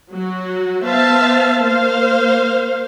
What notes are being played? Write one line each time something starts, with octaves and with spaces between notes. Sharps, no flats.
F#3 F#4
B3 C5 E5 F5 A5
A#3 C5 F5